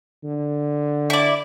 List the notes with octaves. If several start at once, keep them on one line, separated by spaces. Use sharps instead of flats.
D3
E4 D5